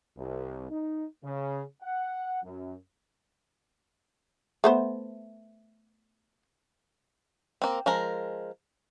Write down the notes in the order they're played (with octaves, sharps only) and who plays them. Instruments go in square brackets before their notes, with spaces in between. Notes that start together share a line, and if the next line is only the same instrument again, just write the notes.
[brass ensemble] C2
D#4
C#3
F#5
F#2
[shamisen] A3 B3 C5
[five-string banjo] A#3 C4
F3 G#3 A#4